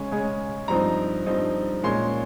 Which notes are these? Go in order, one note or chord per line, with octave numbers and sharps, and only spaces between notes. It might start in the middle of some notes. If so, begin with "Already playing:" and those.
Already playing: C#3 G#3 C#4
C#3 G#3 C#4
G2 F3 C4 D#4 A#5
G2 F3 C4 D#4
A#2 G#3 C#4 C6